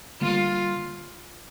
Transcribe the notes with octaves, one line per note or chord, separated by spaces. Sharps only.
D3 G3 A#3 F4